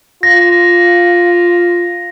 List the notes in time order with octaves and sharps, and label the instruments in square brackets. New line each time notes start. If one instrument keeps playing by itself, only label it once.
[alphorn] F4 [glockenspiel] A#6